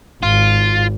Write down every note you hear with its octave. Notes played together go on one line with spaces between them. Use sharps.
G#1 F4